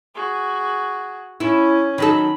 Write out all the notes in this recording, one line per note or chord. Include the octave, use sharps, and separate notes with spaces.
F#4 G#4
C#4 E4
D#3 F#3 A4 B5